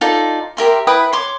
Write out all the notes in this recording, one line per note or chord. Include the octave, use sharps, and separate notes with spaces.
D#4 F4 A4 D5
G4 A#4 E5 C6
E4 B4 G5 D#6
C#5 C6 D6